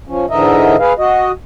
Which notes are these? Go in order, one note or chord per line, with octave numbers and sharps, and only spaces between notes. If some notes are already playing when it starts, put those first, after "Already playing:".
F3 C#4
G#2 D3 E3 A#4 D#5 E5
G#4 B4 F5
F#4 D#5